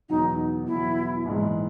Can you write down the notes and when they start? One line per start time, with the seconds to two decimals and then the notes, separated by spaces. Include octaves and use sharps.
0.09 E2 B2 F#3 D#4
0.67 E2 B2 F#3 E4
1.25 A#1 G#2 E3 G#3